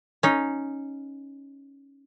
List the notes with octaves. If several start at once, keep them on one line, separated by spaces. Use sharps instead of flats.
C#4 D#4